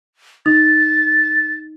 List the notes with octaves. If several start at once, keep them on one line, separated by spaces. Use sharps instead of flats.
D#4 A6